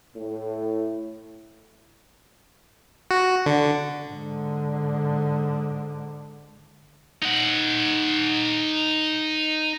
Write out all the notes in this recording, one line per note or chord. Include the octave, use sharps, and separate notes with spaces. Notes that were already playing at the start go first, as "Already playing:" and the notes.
A2
F#4
D3
G#2 D3
D#4 F#5